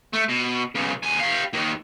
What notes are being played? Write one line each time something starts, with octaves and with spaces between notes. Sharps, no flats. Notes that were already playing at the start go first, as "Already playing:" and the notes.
A3
B2
B1 C#3
D#2 G#5
G4 F5
D#2 D#3